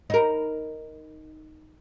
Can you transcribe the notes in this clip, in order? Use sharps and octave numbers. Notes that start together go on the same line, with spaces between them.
D#4 A#4